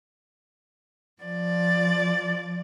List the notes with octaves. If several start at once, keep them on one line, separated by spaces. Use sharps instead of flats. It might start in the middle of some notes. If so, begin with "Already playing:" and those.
F3 D5